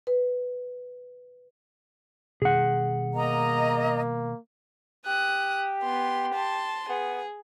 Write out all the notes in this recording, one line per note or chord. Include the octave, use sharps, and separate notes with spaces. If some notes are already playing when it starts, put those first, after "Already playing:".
B4
B2 D#3 G3 G#4 F#5
A#3 D#5 A#5
G4 D#6 F#6
B3 C6
A5 C6
B3 G#4